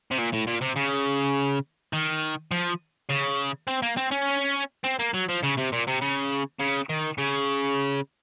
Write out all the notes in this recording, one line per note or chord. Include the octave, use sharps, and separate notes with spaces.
C3
A#2
A2
A#2
C3
C#3
D#3
F3
C#3
C4
A#3
C4
C#4
C4
A#3
F#3
F3
C#3
C3
A#2
C3
C#3
C#3
D#3
C#3